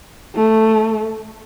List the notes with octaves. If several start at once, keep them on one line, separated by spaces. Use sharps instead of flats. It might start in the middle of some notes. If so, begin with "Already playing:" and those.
A3